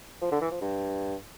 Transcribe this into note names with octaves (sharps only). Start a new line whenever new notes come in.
F3
D3
E3
F3
G2